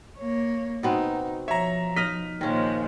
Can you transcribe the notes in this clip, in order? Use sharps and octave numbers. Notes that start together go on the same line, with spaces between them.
A#3 C#5
B2 B3 C4 D#4
F3 C#5 E5 A#5
D#4 D#5 F6 B6
A#2 D#3 F3 G#3 C#4